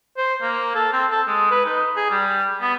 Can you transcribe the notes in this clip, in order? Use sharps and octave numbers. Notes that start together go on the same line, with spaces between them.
C5
A#3
A4
C4
A4
G#3
B4
D#4
G#4
G3
B3